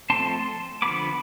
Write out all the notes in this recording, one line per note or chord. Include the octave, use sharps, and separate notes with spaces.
F3 A3 C4 A5 C6
D3 F3 B3 B5 D6